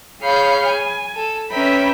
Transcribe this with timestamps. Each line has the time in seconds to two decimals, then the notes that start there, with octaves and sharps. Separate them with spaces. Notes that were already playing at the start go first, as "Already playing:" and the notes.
0.22 G#4 C#5 F5 B5 F6 G6
0.67 G#5
1.16 A4
1.52 C#4 B4 E5 G5 A#5 B5